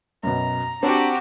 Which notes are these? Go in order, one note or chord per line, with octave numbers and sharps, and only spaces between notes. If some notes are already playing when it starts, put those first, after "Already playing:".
F#2 B2 A#5
C4 D4 F#4 G4